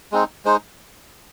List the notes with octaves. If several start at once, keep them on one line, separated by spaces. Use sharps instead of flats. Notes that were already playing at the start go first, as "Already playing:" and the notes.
G#3 C4 D#4
G#3 D#4 C5